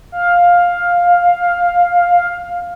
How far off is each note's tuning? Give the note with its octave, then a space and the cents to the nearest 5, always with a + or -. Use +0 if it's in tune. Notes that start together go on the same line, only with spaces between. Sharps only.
F5 +10